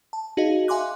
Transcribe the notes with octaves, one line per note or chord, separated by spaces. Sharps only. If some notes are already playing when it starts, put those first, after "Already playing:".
A5
D#4 F#4 G#4 D#5 F5
E5 F5 G#5 C6 D6 F#6